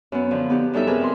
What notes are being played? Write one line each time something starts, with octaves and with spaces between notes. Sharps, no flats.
F#2 B3
D3 F3
B3 D#4 G4
F#2 G3 D#4 A4 E5
C3 G#4 A#4 B4
F2 C6